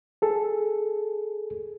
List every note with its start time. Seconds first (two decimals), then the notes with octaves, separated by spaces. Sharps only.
0.22 G#4 A4